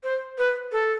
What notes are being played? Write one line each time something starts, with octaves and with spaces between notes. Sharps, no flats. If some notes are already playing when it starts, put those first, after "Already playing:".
C5
B4
A4